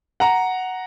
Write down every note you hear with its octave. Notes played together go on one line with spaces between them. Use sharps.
F#5 A#5